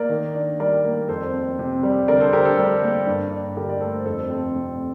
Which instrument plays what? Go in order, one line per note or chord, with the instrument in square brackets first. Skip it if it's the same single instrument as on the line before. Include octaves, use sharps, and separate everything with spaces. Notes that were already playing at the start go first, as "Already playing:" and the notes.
Already playing: [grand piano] A#3 A#4 D5
D#3
D4
G3 A#4 D5
A#3
F2 A4 C5
C4
C3
G3
D3 A#4 D5
A4 C5
D3 G4 A#4
A4
G3
A#3
G2
D4
D3 G4 A#4
D5
A3 A4 C5
F2 A4 C5
C4
C3